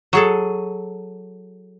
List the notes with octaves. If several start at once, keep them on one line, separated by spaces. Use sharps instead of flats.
F#3 G#4 A4